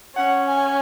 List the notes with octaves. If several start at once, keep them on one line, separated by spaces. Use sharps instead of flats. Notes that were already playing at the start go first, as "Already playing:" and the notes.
C#4 F#5
G#5